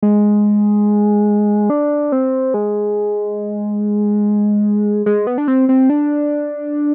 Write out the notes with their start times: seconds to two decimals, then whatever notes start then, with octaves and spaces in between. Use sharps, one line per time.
0.02 G#3
1.70 D4
2.12 C4
2.54 G#3
5.06 G#3
5.27 B3
5.38 D4
5.48 C4
5.69 C4
5.90 D4